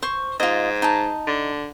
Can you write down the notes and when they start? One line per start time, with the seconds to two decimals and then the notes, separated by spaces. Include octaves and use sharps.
0.02 C5 C#6
0.40 G#2 F4 D#5
0.82 D#4 A5
1.27 D3